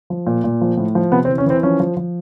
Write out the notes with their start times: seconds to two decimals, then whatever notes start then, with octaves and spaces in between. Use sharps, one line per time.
0.10 F3
0.27 A#2
0.44 A#2
0.61 F3
0.77 A2
0.95 F3
1.12 C3 B3
1.25 C4
1.28 E3
1.38 C#4
1.46 E3 C4
1.63 F3 C#4
1.80 F3
1.97 F3